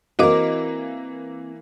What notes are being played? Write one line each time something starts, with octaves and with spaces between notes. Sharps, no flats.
E3 A#3 C4 E4 F#4 A#4 D#5 D6